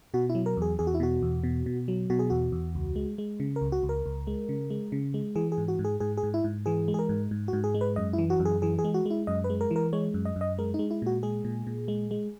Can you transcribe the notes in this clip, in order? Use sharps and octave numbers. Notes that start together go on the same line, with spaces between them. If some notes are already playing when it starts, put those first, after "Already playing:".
B2 F#4
E4
F#3
A#4
E2 G#4
E2 G#4
F#4
E4
B2 F#4
E2
B2
B2
F#3
B2 F#4
G#4
E2 F#4
E2
C#2
G#3
G#3
C#3
A#4
C#2
F#4
C#2
A#4
C#2
G#3
C#3
G#3
C#3
G#3
E3 G#4
G#4
G#2
F#4
G#2
G#4
G#2 G#4
G#4
G#2
E4
G#2
E3 G#4
G#3
G#4
A#4
G#2
G#2
G#2 F#4
G#4
G#3
B4
F#2 D#5
E4
E3
F#4
F#2
G#4
E3 G#4
G#4
G#3
F#4
G#3 E4
F#2 D#5
B4
G#3
A#4
E3
A#4
G#3 C#5
F#2
D#5
F#2
D#5
G#3 A#4
G#3 D#4
E4
A#2 F#4
G#3 G#4
A#2
A#2
G#3
G#3